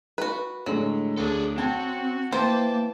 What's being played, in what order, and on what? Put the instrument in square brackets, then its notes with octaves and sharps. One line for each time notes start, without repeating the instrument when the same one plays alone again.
[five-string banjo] F#4 B4
[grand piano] A2 D3 G#3 [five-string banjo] F#3
[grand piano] D2 [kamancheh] D4 [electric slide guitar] G#4 A4
[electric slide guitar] C4 [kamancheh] F#4 [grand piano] G5 A5 G#6
[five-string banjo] E3 C5 [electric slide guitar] A#3 [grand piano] G5 [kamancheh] A5 D6